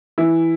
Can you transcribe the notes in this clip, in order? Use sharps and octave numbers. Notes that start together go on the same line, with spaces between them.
E3 E4